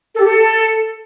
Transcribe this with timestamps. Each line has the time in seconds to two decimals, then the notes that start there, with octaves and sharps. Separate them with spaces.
0.16 A4
0.21 G4
0.26 A4